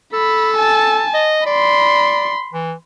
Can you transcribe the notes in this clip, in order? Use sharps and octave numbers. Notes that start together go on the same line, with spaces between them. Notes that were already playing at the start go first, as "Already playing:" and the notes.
A4 B5
G#5 A5
D#5
D5 B5 C6
E3